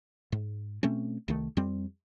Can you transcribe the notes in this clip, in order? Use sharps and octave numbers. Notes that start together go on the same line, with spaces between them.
G#2
B2 A3 C4 C#4
C2 D#3 A3
F2 G3 C4